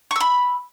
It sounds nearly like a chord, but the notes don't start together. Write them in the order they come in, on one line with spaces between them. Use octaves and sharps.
C#6 E6 B5